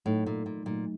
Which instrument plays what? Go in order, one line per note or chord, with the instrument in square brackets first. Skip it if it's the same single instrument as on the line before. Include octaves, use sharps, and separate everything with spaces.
[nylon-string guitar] A2 [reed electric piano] F#3 A3 D#4
[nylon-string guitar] A#2
A#2
[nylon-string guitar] A#2 [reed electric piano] F#3 A3 D#4